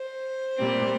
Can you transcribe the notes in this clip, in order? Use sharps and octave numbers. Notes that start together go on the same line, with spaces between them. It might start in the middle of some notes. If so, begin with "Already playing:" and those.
Already playing: C5
A#2 G3 C4